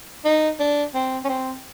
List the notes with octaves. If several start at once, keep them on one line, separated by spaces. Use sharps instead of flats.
D#4
D4
C4
C#4
C4